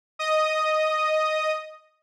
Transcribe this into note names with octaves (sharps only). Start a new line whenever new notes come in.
D#5 D#6